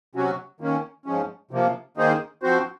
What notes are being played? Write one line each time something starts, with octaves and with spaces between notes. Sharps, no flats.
C3 F#3 C#4 F#4
D#3 A#3 C#4
G#2 F3 G#3 C#4
C3 F3 A#3
D#3 A#3 D#4 G#4 C5
F3 C4 F#4 C5